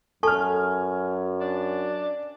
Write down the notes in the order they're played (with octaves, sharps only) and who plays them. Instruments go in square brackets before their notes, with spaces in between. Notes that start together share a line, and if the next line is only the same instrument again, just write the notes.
[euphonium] F#2 [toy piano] A4 A5 C#6 [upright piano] G#5 F6
[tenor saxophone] D4